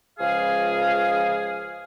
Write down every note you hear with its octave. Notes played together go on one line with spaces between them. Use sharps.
C#2 F3 G#4 F5